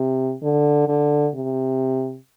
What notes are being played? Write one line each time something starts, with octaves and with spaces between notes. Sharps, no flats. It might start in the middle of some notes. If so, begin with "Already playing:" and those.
Already playing: C3
D3
D3
C3